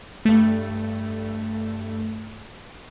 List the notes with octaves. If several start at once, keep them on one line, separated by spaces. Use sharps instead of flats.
G2 A3